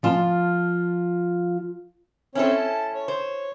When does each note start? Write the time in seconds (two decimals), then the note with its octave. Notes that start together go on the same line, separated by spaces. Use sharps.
0.03 F3 F4 A5
2.35 C4 C#4 E4 A4 C#5
2.55 A5
2.94 C#5
3.08 C5